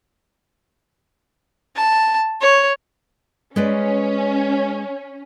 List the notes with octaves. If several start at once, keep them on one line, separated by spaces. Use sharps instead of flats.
A5
C#5
G#3 C#4 B4 D5